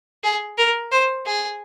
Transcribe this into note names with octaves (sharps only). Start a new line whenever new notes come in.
G#4
A#4
C5
G#4